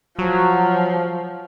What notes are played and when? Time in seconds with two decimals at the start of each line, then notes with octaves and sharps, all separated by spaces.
0.19 F3 F#3